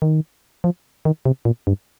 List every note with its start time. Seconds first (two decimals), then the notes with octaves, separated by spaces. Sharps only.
0.02 D#3
0.64 F3
1.05 D#3
1.26 C3
1.45 A#2
1.67 G2